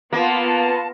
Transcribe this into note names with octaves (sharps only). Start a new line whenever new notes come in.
A#3 B3 F4 A5